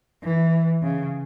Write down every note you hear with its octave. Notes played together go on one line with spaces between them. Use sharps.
E3
C#3